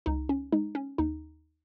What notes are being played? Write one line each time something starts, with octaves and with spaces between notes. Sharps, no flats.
C#2 D#4
C#4
G#3 D#4
C#4
D#2 D#4